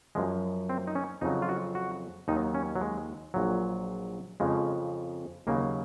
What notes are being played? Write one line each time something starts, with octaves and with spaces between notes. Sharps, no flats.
F#2 F3 G#3
C4
D#4
C#4
F2 C#3 F#3 D#4
F4
F#4
F#4
D#2 D#3 F#3 D#4
C#4
F#3
G#3
A#1 A#2 F#3
F2 C#3 F3 G#3
D#2 C#3 F#3 A#3